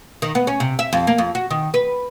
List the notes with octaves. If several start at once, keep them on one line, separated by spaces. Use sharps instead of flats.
D#3
B3
C#4
C3
E5
F2
A#3
F2
F#4
D#3
B4